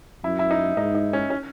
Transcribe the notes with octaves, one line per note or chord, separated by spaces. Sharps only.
F#2 E4
E4
D#4
G#2 D#4
D#4
C#4
C#4